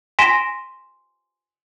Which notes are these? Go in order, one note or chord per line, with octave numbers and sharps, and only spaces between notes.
G#5 C6 A#6 B6 D7 E7